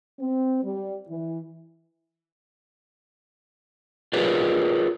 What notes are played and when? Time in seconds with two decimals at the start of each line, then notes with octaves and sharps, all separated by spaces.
0.19 C4
0.63 G3
1.08 E3
4.13 F4 G#4 A#4 B4 D5 D#5